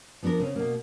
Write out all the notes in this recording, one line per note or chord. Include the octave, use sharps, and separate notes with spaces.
F3 B3 D4 A4 A#4
C#3 C4 C#4
B2 A#3